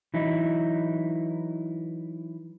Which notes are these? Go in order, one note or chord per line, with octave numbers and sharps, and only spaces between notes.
E3 F#3 D#4 E4